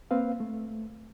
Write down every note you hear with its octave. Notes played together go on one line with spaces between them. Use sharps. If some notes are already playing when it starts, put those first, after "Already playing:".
A#3 C4 B4 F5
A3